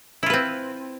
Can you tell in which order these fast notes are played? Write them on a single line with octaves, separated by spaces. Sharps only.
E4 F4 B4 C4